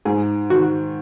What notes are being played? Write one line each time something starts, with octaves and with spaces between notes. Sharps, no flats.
G#2 G#4
D#3 F#4